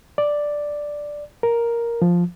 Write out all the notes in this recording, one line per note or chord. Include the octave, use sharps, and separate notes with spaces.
D5
A#4
F3